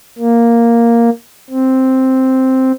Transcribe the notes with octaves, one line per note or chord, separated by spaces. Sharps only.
A#3
C4